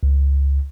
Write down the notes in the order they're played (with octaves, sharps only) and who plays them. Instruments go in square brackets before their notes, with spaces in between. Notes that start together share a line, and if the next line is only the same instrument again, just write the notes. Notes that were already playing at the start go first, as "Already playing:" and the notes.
[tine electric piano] C#2